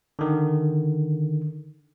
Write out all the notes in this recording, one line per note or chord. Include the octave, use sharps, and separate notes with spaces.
D3 D#3